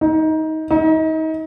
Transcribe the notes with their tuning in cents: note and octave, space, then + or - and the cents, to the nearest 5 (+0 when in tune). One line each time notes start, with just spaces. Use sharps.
D#4 +20
D#4 +30